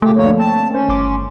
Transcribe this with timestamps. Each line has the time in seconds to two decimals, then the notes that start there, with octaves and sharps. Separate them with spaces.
0.02 A#2 C#3 A3 G4
0.17 D2 G2 D3 F3 A#3 C#5
0.39 C4 A5
0.70 D#3 C#4 C5
0.89 G1 C6 D6